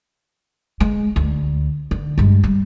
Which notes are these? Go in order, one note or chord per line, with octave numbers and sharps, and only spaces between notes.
G#3
D2
D3
G2 G#3
G3